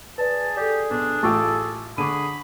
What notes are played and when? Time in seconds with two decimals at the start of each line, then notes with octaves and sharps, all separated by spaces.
0.18 G#4 B4 D5 A5
0.57 G4 A4 D5
0.90 B1 D4
1.23 A1 F4 A4 G5 A5 C#6 D6
1.98 D3 G#4 B5 C#6 D6 D#7